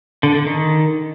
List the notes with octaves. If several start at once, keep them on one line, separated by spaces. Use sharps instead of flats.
D3
D3
D#3